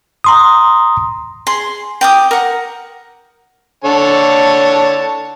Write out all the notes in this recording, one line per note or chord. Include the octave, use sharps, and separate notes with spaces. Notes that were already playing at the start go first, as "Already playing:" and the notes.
A#5 C6 D#6
G#4 C6
G5 D6 D#6
A#4 F#5
D3 C#5 A5